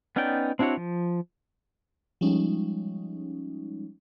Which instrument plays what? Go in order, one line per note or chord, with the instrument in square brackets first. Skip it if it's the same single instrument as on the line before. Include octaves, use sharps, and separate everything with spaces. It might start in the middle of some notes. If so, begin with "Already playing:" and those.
[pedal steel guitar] B3 C#4 D#4 D5 G5
C4 D4 E4 F#4 C#5
F3
[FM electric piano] F3 G3 G#3 C#4 D#4